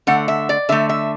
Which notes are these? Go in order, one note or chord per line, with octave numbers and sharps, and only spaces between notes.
D3 A3 F#5
E5
D5
D3 A3 E5
E5